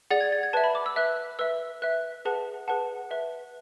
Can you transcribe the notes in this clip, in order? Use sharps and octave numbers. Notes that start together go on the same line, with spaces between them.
G#4 D5 F#5 A6
G#6
A6
G#6
B4 E5 A5
B5
D6
E6
B4 E5 F#6
B4 E5 E6
B4 E5 F#6
G#4 B4 F#5 A5
G#4 B4 F#5 A5
B4 E5